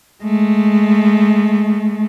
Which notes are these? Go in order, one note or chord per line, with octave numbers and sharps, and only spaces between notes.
G#3 A3